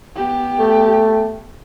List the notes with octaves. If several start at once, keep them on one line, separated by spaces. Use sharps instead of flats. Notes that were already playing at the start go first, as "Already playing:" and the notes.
B3 G4
A3